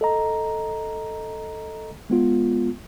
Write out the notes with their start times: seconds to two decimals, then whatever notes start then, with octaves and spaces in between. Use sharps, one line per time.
0.01 A4 D#5 A#5
2.10 G#3 B3 F4